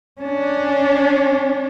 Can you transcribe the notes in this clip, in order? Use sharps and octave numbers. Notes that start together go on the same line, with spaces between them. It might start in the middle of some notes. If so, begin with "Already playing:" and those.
C#4 D4